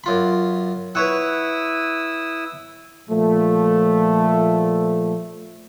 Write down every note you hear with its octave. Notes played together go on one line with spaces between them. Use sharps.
F#2 F4 B5
E4 B4 C#5 F#5 D#6 E6
A#2 F3 A3